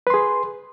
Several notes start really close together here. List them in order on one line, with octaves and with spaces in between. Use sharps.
B4 C6 G#4